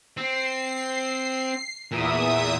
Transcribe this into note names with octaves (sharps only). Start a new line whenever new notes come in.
C4 C7
E2 A#2 E5 D#6